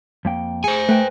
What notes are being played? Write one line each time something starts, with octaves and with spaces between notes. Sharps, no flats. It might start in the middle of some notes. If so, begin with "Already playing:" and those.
F2 A#3 G5
G#4 C5 G#5 C#7
A3 B4 G5